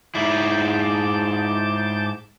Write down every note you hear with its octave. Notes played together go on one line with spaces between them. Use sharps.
G#2 E4 A5 D6 G6